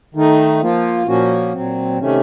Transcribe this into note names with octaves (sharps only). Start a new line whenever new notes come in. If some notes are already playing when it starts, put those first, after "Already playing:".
D#3 A3 D#4
F3 A#3 F4
A#2 F3 A#3 C#4 F#4
A#2 F#3 C4
C3 D#3 A3 C#4